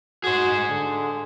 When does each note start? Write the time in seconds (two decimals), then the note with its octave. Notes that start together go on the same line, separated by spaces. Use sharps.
0.24 F#4 G#4 C5
0.69 D3